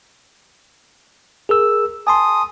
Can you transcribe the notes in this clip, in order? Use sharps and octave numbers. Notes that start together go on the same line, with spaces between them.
G#4 A#4 E6
G#5 A5 C6 D#6